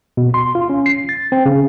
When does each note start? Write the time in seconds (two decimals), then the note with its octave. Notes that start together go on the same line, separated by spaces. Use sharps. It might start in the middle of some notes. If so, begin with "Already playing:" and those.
0.17 B2
0.34 C6
0.55 F4
0.70 C#4
0.86 C7
1.09 A6
1.32 C4
1.46 C#3